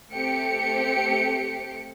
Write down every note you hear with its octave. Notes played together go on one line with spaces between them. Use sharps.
A3 C4 G4 C#7 D7